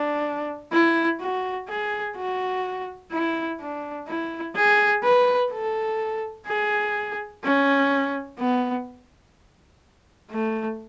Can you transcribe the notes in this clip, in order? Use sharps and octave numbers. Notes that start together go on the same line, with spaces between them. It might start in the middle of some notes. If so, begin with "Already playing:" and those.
Already playing: D4
E4
F#4
G#4
F#4
E4
D4
E4
G#4
B4
A4
G#4
C#4
B3
A3